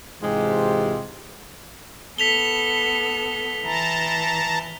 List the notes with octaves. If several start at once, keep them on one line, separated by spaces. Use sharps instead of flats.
G#2 C3 E3 G#3 F4 G4
B3 A4 B6 F7 G7
E3 A5 A#5